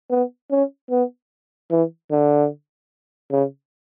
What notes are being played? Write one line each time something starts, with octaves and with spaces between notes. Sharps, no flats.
B3
C#4
B3
E3
D3
C#3